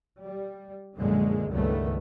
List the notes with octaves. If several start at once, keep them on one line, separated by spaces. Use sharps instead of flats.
G3
A#1 F#2 D3 G#3
C#2 G2 D#3 G3 A3 B3